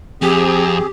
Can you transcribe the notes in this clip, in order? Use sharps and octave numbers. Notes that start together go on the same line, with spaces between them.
F2 C4 G4 G#4